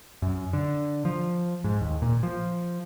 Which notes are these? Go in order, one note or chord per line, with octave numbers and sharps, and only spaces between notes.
F#2
D3
F3
G#2
D#2
A#2
F3